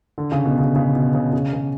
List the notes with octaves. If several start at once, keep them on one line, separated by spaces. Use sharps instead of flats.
D3
C#3
B2
C#3
C#3
B2
C#3
C#3
C#3